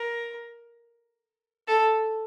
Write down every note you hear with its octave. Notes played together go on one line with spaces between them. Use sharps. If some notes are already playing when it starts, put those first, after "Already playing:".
Already playing: A#4
A4